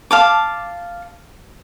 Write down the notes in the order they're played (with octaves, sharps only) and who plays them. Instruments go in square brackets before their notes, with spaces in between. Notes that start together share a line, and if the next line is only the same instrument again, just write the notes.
[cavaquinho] F5 A5 D6